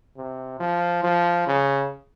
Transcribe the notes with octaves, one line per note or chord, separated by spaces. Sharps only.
C3
F3
F3
C#3